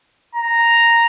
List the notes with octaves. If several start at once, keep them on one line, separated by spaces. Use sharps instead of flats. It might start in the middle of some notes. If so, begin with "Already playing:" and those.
A#5